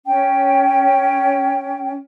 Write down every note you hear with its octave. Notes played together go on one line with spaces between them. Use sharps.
C#4 G5